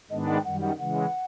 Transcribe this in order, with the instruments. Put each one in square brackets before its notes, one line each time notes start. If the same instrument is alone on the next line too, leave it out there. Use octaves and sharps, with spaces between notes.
[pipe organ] G#2 D#3 G#3 B3 D4 [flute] D#5
[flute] F#5
G5
[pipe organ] F#2 D#3 G3 [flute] F#5
[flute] F#5
[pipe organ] C#3 E3 G#3 [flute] F#5